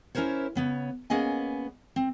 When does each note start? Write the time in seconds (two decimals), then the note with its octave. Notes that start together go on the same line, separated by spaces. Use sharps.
0.15 C#4 E4 A#4 C5 C#5
0.55 C#3 B3 C#5
1.10 A#3 B3 C#4 G#4 D#5 G#5
1.96 C4